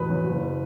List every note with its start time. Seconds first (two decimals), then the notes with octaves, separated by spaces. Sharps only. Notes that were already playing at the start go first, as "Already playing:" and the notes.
Already playing: A1 E2 B2 B4
0.10 F#3
0.27 F#1